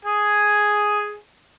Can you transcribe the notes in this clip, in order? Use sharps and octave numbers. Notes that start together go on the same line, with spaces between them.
G#4 G#5